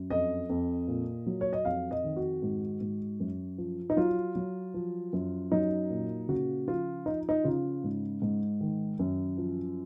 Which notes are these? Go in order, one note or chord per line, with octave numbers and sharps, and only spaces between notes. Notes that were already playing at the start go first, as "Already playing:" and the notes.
Already playing: F#2
F2 D#5
F2
A#2
F#3
C#5
D#5
F2 F5
D#5
D#3
F#4
G#2
G#2
F#2
F3
D#4
F#3 F4
F#3
F3
F#2
F#3 D#4
A#2
C#3 F#4
F3 F4
F3 D#4
D#4
C#3 F4
G#2
G#2
D#3
F#2
F3